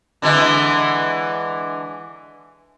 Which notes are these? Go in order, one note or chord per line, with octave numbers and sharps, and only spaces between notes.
D3 E3 G#3